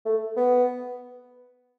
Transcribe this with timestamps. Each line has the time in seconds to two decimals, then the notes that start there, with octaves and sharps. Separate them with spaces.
0.06 A3
0.36 B3